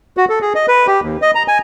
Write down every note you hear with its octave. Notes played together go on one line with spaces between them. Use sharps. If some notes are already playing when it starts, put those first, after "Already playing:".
F#4
A4
G#4
D#5
B4
G4
D#2
D#5
A#5
G#5